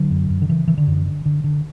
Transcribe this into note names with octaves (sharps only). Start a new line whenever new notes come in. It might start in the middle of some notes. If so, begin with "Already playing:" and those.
Already playing: D3 F#3
F#2
F#2
D3
C#3 E3
C#3 E3
D3
F#2
D3
D3
D3